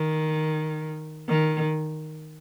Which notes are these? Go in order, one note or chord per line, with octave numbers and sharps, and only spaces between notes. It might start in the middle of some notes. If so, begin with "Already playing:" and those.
Already playing: D#3
D#3